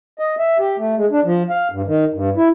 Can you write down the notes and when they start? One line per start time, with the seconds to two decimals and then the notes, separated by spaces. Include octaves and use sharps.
0.19 D#5
0.38 E5
0.59 G4
0.78 A3
0.96 G#3
1.11 D4
1.25 F3
1.50 F5
1.72 G2
1.87 D#3
2.14 G2
2.37 E4